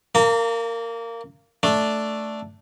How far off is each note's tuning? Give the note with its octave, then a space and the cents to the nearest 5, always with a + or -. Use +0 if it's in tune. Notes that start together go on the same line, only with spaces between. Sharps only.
A#3 -15 A#5 -45
A3 +0 D4 +0